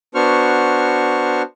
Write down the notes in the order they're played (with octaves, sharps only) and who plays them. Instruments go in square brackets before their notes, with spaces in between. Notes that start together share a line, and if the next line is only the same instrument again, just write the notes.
[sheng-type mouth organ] B3 D4 F#4 C5 C#6 F6